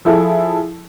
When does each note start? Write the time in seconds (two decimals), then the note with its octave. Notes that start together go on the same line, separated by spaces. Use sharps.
0.05 F3 E4 G#4 A4